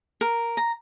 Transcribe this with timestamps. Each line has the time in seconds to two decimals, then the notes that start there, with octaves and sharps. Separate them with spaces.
0.21 A#4
0.57 A#5